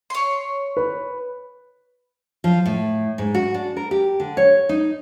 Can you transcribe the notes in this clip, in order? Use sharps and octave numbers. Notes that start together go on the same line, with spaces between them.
C#5 C6
B4
F3
A2
G#2
F#4
D4
A#4
G4
D3
C#5
D#4